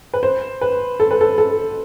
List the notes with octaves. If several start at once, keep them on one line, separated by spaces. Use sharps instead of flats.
B4
C5
B4
A4
B4
A4
A4